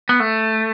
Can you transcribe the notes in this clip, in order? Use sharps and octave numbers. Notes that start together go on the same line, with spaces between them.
B3
A3